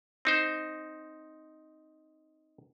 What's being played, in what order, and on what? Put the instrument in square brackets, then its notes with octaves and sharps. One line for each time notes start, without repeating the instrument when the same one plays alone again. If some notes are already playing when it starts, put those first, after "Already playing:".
[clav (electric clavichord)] C4 D#4 C5